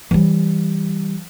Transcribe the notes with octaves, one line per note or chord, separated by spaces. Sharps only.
E3 G3